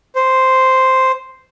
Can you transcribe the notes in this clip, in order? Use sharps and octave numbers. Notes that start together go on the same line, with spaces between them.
C5